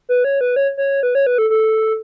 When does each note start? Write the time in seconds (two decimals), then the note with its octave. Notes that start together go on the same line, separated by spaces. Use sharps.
0.09 B4
0.24 C#5
0.41 B4
0.56 C#5
0.77 C#5
1.03 B4
1.15 C#5
1.27 B4
1.38 A4
1.50 A4